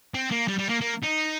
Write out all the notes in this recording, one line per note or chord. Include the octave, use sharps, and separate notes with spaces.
C4
A#3
G3
G3
A#3
A#3
D#4